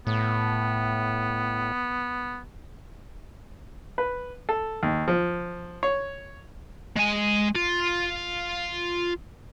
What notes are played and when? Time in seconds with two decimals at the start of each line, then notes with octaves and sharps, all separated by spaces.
0.07 A2 B3
3.98 B4
4.49 A4
4.83 D#2
5.08 F3
5.83 C#5
6.97 G#3 G#5
7.55 F4